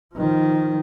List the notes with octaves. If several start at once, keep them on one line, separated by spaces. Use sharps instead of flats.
D#3 F3